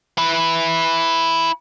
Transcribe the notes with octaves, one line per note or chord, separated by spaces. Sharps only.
E4 B4